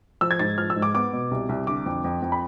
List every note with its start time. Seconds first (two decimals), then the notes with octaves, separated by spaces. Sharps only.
0.21 F3 E6
0.31 G#6
0.39 G#2 A6
0.58 F3 F6
0.70 E6
0.76 G#2
0.82 D6
0.94 B3 D6
1.13 B2
1.31 C2
1.49 C2
1.67 D3 D6
1.86 F2
2.04 F2
2.22 F2
2.32 B5